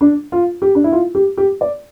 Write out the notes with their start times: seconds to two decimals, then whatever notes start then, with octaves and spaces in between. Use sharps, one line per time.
0.01 D4
0.32 F4
0.62 G4
0.75 D4
0.84 E4
0.92 F4
1.15 G4
1.37 G4
1.61 D5